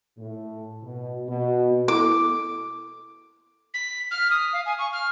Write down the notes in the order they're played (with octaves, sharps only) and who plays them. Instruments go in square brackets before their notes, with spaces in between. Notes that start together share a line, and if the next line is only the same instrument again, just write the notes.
[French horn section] A2
B2
B2
[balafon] E4 A4 [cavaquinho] D6
[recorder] B6
F6
D#6
F5
G#5
C#6
F6